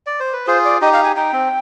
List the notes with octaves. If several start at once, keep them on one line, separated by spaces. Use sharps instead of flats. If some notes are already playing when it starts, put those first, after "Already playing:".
D5
C5
B4
F4 G#4 C5
D5
D#4 G4 D#5
F5
G#5
D#4 G5
C4